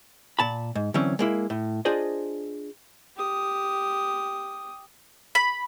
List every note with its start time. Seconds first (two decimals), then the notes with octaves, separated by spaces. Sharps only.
0.39 A#2 A5 B5
0.75 G#2
0.94 D3 E3 F#3 C4 C#4
1.19 G#3 A#3 E4
1.50 A2
1.85 D4 F4 G#4 C5 D5 D#5
3.16 G4 D#6
5.35 B5